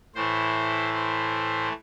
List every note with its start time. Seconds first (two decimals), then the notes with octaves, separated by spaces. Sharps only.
0.15 A2 E3 A3 C5
0.94 C5